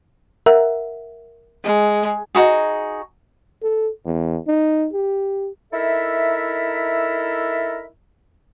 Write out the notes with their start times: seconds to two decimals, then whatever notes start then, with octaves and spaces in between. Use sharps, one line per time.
0.46 A#4 E5 F#5
1.64 G#3
2.35 D#4 E4 F#4 G#4
3.63 A4
4.06 E2
4.48 D#4
4.93 G4
5.73 D#4 E4 A4 A#4 E5